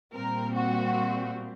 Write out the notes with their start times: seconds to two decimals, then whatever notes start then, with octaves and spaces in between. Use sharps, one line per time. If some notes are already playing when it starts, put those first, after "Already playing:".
0.13 A#2 G3 C4 A#4
0.55 F#4